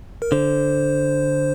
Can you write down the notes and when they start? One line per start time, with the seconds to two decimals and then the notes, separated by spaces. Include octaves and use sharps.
0.22 A#4
0.32 D3 C5